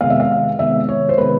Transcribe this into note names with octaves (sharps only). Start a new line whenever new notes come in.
C3 D#3 G#3 B3 F5
E5
F5
C3 D#3 G#3 B3 E5
C#5
C5
C3 D#3 G#3 B3 B4